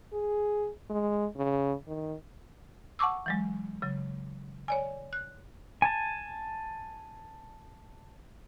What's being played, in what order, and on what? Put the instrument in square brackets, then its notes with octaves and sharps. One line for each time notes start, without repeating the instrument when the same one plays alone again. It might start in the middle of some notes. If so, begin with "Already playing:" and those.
[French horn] G#4
G#3
C#3
D#3
[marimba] F#5 A5 C#6 D6 E6
E3 F#3 G#3
C#3 F#3
C#5 D5 G#5
F#6
[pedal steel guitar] G#5 A5